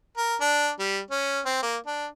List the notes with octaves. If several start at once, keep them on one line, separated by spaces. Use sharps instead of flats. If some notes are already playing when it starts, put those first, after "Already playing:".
A#4
D4
G3
C#4
C4
A#3
D4